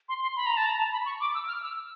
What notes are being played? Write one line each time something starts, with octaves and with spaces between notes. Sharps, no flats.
C6
C6
B5
A#5
A5
A#5
A5
B5
C#6
D6
E6
F6
E6